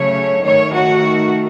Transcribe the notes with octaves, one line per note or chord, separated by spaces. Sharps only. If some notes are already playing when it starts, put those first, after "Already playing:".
Already playing: C#3 F#3 A3 C#5
D#3 A3 C#5
F#4